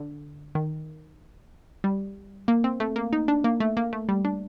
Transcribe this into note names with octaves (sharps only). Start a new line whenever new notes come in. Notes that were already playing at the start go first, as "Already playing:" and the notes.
Already playing: D3
D#3
G3
A#3
C4
A3
A#3
D#4
D4
A#3
A3
A#3
A3
G3
D4